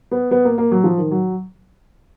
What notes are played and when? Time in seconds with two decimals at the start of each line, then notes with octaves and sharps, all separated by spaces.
0.11 B3
0.31 B3
0.45 A#3
0.58 A#3
0.71 F#3
0.84 F3
0.98 D#3
1.11 F#3